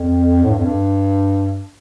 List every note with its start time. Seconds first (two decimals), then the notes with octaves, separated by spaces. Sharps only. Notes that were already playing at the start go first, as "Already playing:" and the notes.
Already playing: F2
0.44 A2
0.51 G2
0.58 F2
0.65 G2